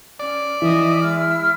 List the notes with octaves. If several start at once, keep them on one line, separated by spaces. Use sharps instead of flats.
C#4 D5
E3 D#5 E5
G#3 E4 E6 F6